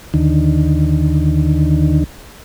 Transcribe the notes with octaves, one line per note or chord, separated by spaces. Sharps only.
D#2 D3 D#3